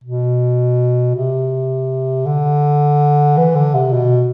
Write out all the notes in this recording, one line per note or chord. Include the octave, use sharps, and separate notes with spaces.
B2
C3
D3
E3
D3
C3
B2